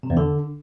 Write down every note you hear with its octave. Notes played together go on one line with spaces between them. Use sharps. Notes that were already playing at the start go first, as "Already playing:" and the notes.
C3
E2
D3